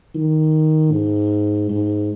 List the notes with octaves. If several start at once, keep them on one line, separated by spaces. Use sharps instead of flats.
D#3
G#2
G#2